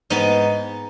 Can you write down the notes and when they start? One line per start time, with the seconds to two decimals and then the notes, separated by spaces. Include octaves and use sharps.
0.10 G#2 B3 D#4